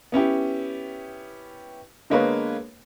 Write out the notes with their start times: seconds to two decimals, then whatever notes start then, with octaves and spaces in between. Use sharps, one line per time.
0.12 B3 C#4 E4 G4
2.10 D3 G#3 A#3 B3 B4 C#5